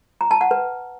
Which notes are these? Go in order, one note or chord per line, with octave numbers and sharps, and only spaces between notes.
A#5
A5
F#5
B4